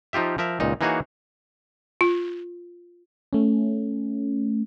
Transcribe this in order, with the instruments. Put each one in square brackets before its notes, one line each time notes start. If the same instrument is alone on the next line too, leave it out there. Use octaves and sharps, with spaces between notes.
[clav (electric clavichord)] F3 D#4 F4 G4 E5
F3 A#4 E5
C#2 A#2 D#4
E3 A#3 D#4 F#4 G#4 C#5
[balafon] F4
[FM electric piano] A3 C#4